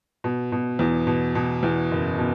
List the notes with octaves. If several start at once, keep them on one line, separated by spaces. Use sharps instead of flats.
B2
B2
E2
B2
B2
E2
F#1
B2